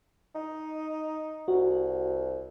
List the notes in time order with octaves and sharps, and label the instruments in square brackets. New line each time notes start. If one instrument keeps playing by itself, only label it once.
[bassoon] D#4
[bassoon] C2 [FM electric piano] F#4